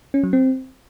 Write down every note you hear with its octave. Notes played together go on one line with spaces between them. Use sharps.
C#4
F#3
C4